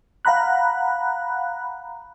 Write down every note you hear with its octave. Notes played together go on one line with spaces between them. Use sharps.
F5 F#5 A#5 B5 F#6